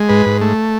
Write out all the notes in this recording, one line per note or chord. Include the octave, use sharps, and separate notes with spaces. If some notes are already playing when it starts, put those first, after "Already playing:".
Already playing: G#3
G#2 B4
G#2
A3